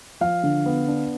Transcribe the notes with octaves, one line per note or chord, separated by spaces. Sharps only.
F3 F5
D3
B3
D4